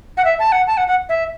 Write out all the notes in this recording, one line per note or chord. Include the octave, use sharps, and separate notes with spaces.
F#5
E5
A5
F#5
A5
F#5
F#5
E5